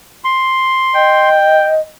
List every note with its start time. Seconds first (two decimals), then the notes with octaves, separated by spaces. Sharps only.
0.24 C6
0.95 D#5 G5